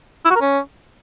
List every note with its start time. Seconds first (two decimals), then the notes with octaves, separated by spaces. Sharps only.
0.25 E4
0.30 F#4
0.36 A#4
0.41 C#4